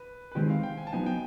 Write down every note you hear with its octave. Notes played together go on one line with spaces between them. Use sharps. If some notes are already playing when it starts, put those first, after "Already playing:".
Already playing: B4
B4
D#3 G#3 C4 D#4 G4 C5
F5
G5
G#5
A5
F#3 B3 D#4 G#5
G5